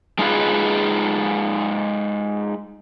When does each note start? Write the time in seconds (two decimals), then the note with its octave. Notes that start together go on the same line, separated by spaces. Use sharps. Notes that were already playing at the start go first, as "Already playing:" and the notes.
0.19 G#3 D#4 F4 G#4 B4